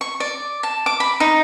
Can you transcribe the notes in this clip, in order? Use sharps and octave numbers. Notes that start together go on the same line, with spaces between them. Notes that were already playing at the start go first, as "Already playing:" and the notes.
C#6
D5
A5
D6
B5
D#4